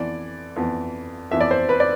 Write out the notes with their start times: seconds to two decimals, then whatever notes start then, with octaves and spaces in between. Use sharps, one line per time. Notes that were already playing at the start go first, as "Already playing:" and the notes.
Already playing: F2 E3 B3 D5
0.56 F2 E3 B3
1.31 F2 E3 B3 E5
1.40 D5
1.51 C5
1.69 B4
1.80 D5